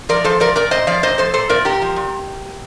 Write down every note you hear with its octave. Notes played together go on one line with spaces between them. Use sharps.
F3 A#4 D5
F3 A4 C5
F3 A#4 D5
A#2 A#4 D5
A#2 C5 D#5
F3 D5 F5
A#2 C5 D#5
F3 A4 C5
A#2 A4 C5
A#2 A#4 D5
A#2 G4 A#4
F3
A#2